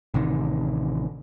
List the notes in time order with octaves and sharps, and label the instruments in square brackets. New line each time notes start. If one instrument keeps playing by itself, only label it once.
[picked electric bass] A1 C3 D#3